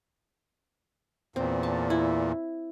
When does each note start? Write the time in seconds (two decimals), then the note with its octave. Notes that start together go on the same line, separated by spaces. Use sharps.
1.36 E2 A#2 C4
1.63 A5
1.90 E4